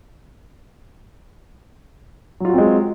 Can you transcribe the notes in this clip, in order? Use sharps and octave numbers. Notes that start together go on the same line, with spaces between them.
F#3 G#3 C4 F4 F#4